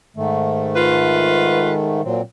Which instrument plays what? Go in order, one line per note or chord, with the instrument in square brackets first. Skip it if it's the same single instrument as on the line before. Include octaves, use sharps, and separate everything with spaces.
[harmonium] G#2 D#3 A3
[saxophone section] F4 B4
[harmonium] A#2 F#3 C4